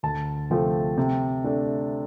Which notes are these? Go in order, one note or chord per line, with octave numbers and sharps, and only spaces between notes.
D2 A5
C3 F3 A3 C4
C3
A3 D4